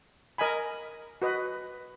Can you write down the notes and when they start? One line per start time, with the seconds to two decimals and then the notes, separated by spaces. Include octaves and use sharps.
0.38 A#4 D#5 G#5 B5
1.22 F#4 B4 D#5